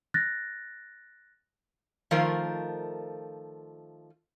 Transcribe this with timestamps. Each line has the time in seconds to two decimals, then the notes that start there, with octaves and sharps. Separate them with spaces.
0.14 F#6 A6 A#6
2.11 D#3 F3 A3 F4 A#4 C5